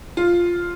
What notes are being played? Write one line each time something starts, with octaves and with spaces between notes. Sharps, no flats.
F4